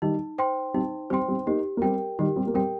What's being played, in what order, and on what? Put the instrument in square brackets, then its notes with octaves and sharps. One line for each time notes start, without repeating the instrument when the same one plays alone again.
[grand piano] D#3 G3 [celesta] D#4
[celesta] C5 G5 C6
[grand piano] G3 C4 [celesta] D#4
[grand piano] G3 C4 [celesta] C5 G5 C6
[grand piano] G3 C4
[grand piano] A#3 D#4 [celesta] G4
[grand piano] A#3
[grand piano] G3 C4 [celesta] A#4 G5
[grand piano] D#3 G3 [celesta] G4
[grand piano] G3 C4
A#3
[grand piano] G3 C4 [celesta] A#4 G5